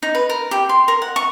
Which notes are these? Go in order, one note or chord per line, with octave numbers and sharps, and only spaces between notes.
D#4
B4
A#4
G4
C6
A#4
F#5
C#6